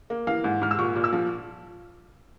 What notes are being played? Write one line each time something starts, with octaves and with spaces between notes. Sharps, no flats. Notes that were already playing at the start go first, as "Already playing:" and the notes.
A#3
E3 F5
G#2
G#2 F6
E6
A#2 C#6
A#2
E6
F3